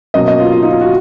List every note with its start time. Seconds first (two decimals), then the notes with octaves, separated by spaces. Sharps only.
0.14 B2 F#3 A#3 C#4 D#5
0.28 D#5
0.40 F4
0.52 F4
0.62 D#4
0.71 F4
0.81 F#4